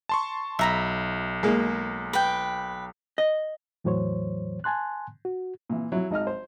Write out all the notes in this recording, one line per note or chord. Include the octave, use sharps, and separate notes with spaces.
A5 C6 C#6
B1 E5 A#5 B5
G#3 A#3
B4 G5
D#5
E2 A2 E3 F#3 C5 C#5
G#5 A5 C6 F#6
F#4
A#2 E3
F#3 E4
G#1 D#4 D#5 F6
C5